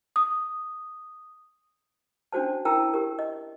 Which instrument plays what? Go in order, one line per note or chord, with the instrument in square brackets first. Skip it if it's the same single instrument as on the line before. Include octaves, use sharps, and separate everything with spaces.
[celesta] D#6
[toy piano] C#4 D4 F#4 C5 A5
E4 A#4 G5 A5 A#5 E6
G4 A#4
D#5